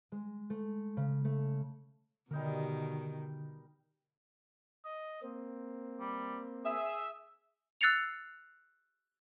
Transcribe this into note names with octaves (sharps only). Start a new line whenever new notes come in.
G#3
A3
C#3
A3
B2 D3 D#3 G3 D#4 A#4
D#5
A#3 C4
G3
G#4 E5
E6 F#6 A6 C7 C#7 F7